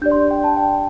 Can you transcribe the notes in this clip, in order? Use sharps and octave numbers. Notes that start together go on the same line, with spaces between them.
D4 G4 D5 G6
C6
G5
A5
G5